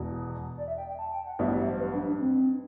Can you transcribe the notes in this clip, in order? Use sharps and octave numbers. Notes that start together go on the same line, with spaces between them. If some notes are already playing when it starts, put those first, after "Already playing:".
Already playing: E1 E2 B2
D5
E5
G5
G5
A5
G5
F#5
A1 G2 F#3 B3 E5
D5
E5
C5
B4
D4
D4
C4